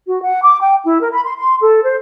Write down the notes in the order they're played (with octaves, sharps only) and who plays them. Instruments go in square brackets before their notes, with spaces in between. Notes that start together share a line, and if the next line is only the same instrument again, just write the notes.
[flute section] F#4
F#5
D6
G5
E4
A#4
B5
C6
C6
A4
C5